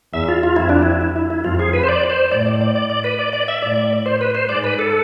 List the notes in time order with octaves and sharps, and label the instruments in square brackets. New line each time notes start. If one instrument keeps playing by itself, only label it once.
[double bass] E2 [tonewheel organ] E5
[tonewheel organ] F4
F4
[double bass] F2 [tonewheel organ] E4
[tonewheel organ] D4
E4
E4
E4
E4
[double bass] F2 [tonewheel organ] F4
[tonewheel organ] G#4
B4
C5
D5
C5
[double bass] A2 [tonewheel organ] D5
[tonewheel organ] D5
D5
D5
D5
B4
D5
D5
E5
[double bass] A2 [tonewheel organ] D5
[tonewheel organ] C5
B4
C5
[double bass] G#2 [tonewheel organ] D5
[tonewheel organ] B4
A4